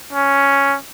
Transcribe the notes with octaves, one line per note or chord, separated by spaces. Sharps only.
C#4